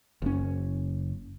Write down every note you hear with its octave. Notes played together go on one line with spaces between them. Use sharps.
F#1 C#4